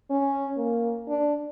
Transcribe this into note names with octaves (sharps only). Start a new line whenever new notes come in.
C#4
A#3
D4